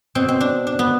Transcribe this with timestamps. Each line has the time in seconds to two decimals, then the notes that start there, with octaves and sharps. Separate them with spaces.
0.15 B2 C4
0.28 C4
0.41 D4
0.67 D4
0.79 B3